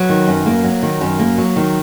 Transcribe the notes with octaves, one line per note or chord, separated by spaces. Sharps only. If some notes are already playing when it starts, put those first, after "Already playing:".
Already playing: F#3 B4
D#3
F#2
A#3
F#3
D#3
F#2
A#3
F#3
D#3